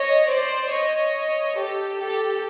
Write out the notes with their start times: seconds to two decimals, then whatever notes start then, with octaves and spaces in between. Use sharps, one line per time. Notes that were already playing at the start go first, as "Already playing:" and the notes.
Already playing: C#5 D#5
0.29 C5 D5
0.72 C#5 D#5
1.57 G4 A4
2.00 G4 A4